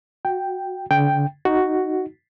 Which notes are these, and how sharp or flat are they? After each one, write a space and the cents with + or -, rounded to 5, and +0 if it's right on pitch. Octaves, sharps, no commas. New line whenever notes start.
F#4 -10 G5 +0
D3 -40 G5 +0
D#4 +0 F#4 +5